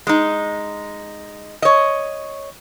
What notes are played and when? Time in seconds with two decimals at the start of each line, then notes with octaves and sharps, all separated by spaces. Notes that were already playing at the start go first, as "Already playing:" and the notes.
0.07 G#3 D#4
1.62 C#5 D#5